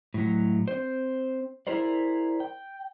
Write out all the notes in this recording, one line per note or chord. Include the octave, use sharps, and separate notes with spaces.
A2 F#3
C4 C5
E4 G#4 A#4 C5 D5
G5